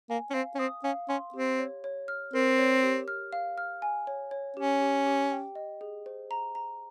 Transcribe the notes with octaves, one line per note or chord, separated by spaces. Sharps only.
A#3 G#5
C#4
C4 F5
C#4
C4 D#6
C#4 F5
C#4 C6
C4 G4
C#5
C#5
F6
C4 A#4
C#5
G4
F6
F5
F6
G#5
C#5
C#5
C#4 G4
G4
G4
G5
D#5
G#4
C5
A#5
A#5